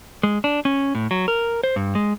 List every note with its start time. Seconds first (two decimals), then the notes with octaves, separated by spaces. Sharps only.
0.23 G#3
0.44 D4
0.65 C#4
0.95 A2
1.11 F#3
1.28 A#4
1.64 C5
1.76 G2
1.95 G#3